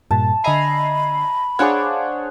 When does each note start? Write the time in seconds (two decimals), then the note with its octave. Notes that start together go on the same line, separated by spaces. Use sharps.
0.11 G2 A#2 A5
0.44 D3 D#5 E5 G#5 A#5 B5 C7
1.59 D4 G#4 C5 C#5 F5 F#5 G#5 D6